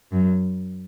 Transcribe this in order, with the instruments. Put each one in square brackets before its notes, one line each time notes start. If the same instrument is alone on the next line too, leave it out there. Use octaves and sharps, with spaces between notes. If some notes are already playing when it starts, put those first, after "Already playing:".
[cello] F#2